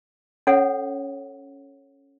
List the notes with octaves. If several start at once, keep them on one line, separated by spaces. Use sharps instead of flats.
C#4 A4 C#5 F#5